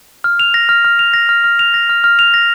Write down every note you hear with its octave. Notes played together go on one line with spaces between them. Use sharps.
F6
F7
A#6
F6
F6
F7
A#6
F6
F6
F7
A#6
F6
F6
F7
A#6